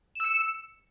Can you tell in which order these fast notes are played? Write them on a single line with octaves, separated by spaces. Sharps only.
E7 E6 C#7